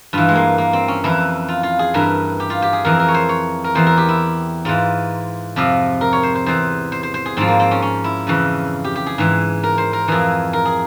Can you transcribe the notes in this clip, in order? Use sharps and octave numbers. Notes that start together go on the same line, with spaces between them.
G2 E3 F4
G#3
A#3
A#3
C4
C#4
F2 E3 E4
F4
F4
G#4
G2 E3 A#4
G4
F4
G4
G#4
F2 E3 A#4
A#4
C#5
C5
C#5
A#4
E2 E3 C5
A#4
G4
E4
G#2 E3 F4
F2 C3 F3
A#4
C#5
C5
C5
E2 E3 C5
C5
C5
C5
G#4
G#2 F3 C4
A#3
C4
C#4
C#4
E4
F2 C#3 E3
G4
G4
G#4
G#2 E3
A#4
C5
A#4
F2 E3 G#4
A#4
G#4